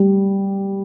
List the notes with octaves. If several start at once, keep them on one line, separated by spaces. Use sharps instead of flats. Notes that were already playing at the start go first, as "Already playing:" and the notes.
Already playing: G3